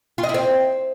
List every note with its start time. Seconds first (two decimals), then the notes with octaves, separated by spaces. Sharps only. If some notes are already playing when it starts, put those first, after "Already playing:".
0.18 F4
0.24 D#5
0.29 E4
0.34 C4